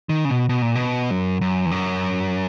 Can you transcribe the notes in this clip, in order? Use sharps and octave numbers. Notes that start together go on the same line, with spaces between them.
D#3
C#3
B2
B2
A#2
B2
F#2
F#2
E2
F#2